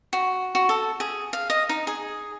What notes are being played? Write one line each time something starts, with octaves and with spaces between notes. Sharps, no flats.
F#4
F#4
A4
G#4
F5
D#5
D#4
G#4